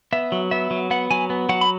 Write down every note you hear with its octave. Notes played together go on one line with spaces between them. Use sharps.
B3 E5
F#3
B3 E5
F#3
B3 F#5
F#3 G#5
B3
F#3 F#5
B5